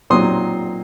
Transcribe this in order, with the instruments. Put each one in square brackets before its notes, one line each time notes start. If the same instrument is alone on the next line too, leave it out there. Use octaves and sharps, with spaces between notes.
[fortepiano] A#2 F#3 C4 D#4 C6 D#6